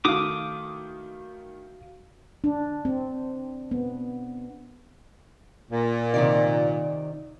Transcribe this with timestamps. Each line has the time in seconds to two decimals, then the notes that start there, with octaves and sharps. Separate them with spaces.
0.05 D#3 A3 E4 F#4 F5 D6 D#6
2.44 D4
2.85 C4
3.71 B3
5.71 A#2
6.14 C3 D#3 D5